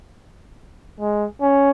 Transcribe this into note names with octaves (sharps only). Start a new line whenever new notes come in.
G#3
C#4